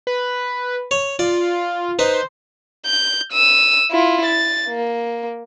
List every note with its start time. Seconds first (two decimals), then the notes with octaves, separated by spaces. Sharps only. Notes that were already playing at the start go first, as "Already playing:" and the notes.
0.07 B4
0.91 C#5
1.19 F4 D5
1.99 D#4 B4 C5
2.86 G6
3.33 E6 D#7
3.91 E4 F4
4.26 A6
4.68 A#3